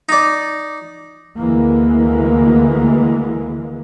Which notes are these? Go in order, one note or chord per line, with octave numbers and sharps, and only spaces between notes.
D#4 D5
D2 E3 G#3 A#3